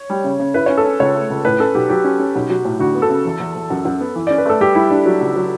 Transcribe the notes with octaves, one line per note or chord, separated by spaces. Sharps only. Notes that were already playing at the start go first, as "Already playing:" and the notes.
Already playing: C#5
G3
C#3
C#3
E4 B4
C#5
C#4
A4
C#4
C#2 C#5
A3
C#2
A2 B4
C#4 A4
B1 G4
F#3 G4
C#4
C#4
B1
F#3
A2
D2 F#4
B3
A4
C#3
E2
E2
E2
F#2
F#2
B3
E3
D5
C#4
B4
A3 A4
G3 G4
G3 E4
G3 D4
F#3
C#2
F#3